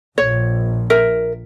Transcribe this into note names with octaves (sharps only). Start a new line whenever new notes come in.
A#1 C#5
A#4 E5